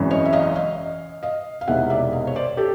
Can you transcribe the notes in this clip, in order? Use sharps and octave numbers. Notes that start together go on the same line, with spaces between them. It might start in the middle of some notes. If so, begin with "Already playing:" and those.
Already playing: G#1 F#2 C#3 E3
C#5 D#5
E5
D#5 F5
D#5 F5
D#5 F5
F5
E1 E2 C3 D#3 E5 F#5
D5 E5
D#5 F5
C#5
C5 D5
G4 A4